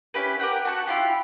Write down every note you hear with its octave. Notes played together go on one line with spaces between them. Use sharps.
C#4 E4 G4 B4
G4 A#4 F#5 G5
F#4 A5 C#6
E4 F4 G4